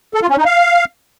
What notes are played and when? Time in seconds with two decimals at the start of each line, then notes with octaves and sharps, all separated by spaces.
0.14 A4
0.22 F4
0.30 C#4
0.37 D#4
0.45 F5